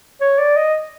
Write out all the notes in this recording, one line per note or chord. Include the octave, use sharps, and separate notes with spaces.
C#5
D5
D#5